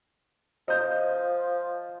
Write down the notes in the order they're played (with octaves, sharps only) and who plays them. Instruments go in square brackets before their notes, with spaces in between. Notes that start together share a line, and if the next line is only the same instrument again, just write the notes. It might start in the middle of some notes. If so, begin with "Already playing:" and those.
[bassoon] F3 [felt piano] D#5 G6